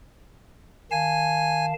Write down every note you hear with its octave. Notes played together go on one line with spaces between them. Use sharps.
D#3 F5 G#5 A5